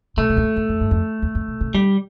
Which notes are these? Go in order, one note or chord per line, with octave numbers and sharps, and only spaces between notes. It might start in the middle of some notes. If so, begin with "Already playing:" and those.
C3 A3
B2
E2
F2
E2
F2
G2
F2
E2
F2
B2
C3
D3 G3